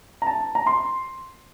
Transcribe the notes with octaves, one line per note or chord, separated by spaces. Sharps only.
A#5
A5
A#5
C6